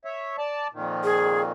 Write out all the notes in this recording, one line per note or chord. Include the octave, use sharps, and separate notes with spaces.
C#5 E5
D5 A5
F2 A#2 D#3
G#4